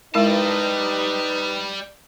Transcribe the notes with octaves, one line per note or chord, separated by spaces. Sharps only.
G3 G#3 D#4 E4 G4 A#4 B4 A5